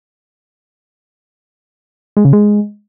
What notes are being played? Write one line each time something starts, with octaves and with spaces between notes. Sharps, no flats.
G#3
C#3
G#3